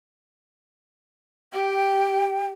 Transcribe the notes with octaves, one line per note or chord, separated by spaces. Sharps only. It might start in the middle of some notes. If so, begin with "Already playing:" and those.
G4 G5